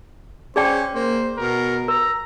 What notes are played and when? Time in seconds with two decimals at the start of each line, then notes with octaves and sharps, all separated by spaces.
0.56 C#4 G#4 C5 D5 G5
0.95 A#3 C5
1.37 B2 A#4
1.88 A#4 A#5